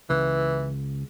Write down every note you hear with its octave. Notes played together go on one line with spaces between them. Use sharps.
C#2 E3